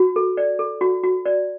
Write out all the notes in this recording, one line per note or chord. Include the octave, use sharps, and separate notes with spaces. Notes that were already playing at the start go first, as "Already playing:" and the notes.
Already playing: F#4
A4
D5
A4
F#4
F#4
D5